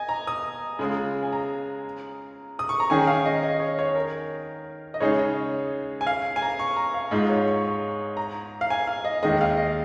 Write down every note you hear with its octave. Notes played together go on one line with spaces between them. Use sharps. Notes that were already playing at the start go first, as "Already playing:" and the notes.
Already playing: D#5 G#5
A#5
D#6
C#3 G#3 F4
G#5
A#5
D#6
C#6
A#5
D#3 C#4 G#4 G#5
F5
D#5
D#5
C#5
C#5
A#4
D#5
C#3 G#3 D#4 G#4 C#5
G#5
F5
G#5
A#5
C#6
A#5
F5
G#2 G#3 F4 D#5
C#5
C#6
C#6
A#5
F5
G#5
F5
D#5
D#2 D#3 G#3 D#5
F5
D#5